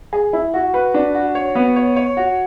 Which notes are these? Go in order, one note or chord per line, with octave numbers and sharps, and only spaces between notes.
G#4
E4
F#4
B4
D4
F#4
C#5
B3
C#5
C#5
F#4